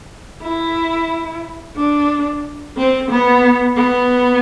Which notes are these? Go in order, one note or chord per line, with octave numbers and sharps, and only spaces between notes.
E4
D4
C4
B3
B3